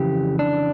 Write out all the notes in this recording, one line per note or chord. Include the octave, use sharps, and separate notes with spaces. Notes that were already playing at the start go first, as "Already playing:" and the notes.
Already playing: F2 C#3 E3 G4
D4